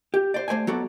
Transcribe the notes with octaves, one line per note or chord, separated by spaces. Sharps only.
G4
C5 D5
A3 C5 D5 G#5
F#3 B3 F#4 A4 D5